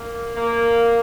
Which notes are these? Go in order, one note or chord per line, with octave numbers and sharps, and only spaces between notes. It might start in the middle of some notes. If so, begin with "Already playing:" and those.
Already playing: A#3
A#3